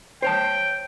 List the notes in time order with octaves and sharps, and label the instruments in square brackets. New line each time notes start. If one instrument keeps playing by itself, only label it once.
[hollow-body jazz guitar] C5 C#5 A5 [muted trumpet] G5